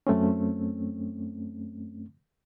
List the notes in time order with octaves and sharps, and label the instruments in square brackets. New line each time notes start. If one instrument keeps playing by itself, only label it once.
[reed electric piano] F#2 A3 C4 C#4